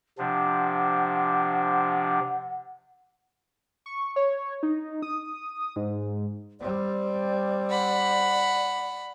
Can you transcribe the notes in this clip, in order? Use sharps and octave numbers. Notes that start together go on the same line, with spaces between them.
C3 F3 D4 F#5
C#6
C#5
D#4
D#6
G#2
G3 C4 D5
F#5 B5